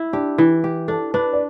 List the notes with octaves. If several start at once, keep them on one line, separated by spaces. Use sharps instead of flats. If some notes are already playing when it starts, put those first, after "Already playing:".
Already playing: E4
D4 G4
E3
G4
D4 A4
D4 B4
D5